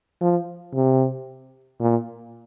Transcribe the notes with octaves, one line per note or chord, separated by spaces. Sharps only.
F3
C3
A#2